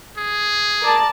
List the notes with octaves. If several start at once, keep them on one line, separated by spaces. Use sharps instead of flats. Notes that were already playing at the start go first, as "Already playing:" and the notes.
G#4
A#4 D5 A5